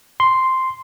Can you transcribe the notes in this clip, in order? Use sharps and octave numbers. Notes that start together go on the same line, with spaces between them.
C6